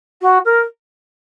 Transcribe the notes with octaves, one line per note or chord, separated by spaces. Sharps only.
F#4
A#4